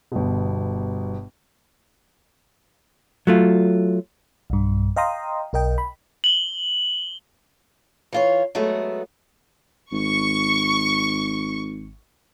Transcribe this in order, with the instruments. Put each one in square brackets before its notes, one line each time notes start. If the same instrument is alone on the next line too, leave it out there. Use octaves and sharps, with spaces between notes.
[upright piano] G1 B2
[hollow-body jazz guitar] F#3 A3 F4
[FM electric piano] B1 G2
D#5 F5 G5 A#5 C6 D#6
B1 A#4 D#5 G5
B5
[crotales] F#7 G7
[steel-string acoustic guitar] E3 F4 C#5
F#3 G#3 A3 B3
[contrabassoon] G#1 [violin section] C#6